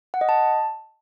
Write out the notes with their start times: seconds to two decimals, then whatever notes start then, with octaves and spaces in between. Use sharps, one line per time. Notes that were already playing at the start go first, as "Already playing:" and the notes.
0.14 F#5
0.21 D#5
0.29 A5